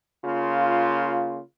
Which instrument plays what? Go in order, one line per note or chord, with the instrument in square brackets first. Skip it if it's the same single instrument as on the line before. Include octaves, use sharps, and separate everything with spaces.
[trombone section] C#3 A#3 F4